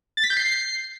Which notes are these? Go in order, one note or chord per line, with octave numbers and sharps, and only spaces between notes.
A6
B6
G6
C7